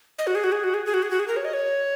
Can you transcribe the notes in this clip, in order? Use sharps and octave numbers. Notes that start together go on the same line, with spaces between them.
D#5
F#4
G#4
F#4
G#4
F#4
G#4
G#4
F#4
G#4
F#4
G#4
A#4
C#5
D#5
C#5